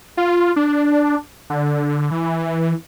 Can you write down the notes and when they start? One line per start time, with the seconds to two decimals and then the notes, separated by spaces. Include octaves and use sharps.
0.17 F4
0.56 D4
1.50 D3
2.11 E3